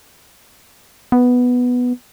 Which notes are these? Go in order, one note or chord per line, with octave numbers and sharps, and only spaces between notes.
B3